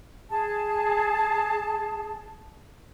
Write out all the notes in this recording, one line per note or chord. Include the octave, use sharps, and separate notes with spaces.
G#4 A5